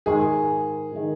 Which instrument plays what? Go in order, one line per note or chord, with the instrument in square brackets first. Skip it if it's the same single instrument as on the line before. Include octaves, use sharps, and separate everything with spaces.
[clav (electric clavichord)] G#2 D#3 G#3 [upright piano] G#4
[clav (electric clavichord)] D#3 G#3